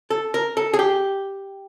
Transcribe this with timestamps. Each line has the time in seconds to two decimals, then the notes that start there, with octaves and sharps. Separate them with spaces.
0.10 A4
0.34 A#4
0.57 A4
0.74 G#4
0.79 G4